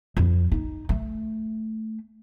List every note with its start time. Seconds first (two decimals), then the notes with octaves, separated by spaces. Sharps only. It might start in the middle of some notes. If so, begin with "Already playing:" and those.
0.17 F2
0.52 D#4
0.89 A3